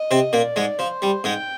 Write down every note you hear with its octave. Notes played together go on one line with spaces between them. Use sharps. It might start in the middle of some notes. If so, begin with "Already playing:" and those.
Already playing: D#5
C3 C4
A#2 A#3 D5
G#2 G#3
F3 C5
G3
G#2 G#3 G5